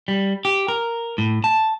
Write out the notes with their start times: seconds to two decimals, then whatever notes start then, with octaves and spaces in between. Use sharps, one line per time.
0.08 G3
0.45 G4
0.68 A#4
1.18 A2
1.44 A5